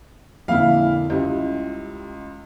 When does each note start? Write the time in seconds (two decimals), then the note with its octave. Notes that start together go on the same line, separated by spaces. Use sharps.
0.48 F2 A#2 D3 E4 F5
1.10 C#2 G3 E4